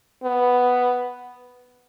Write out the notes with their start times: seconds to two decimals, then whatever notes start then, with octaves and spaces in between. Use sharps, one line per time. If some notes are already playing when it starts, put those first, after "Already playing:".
0.24 B3